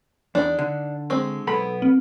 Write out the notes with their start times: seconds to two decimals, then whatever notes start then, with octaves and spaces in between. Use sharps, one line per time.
0.35 E2 D4 D#4
0.59 D3
1.10 G#3 C4 C#6
1.47 B1 B3 A4 B5
1.82 C4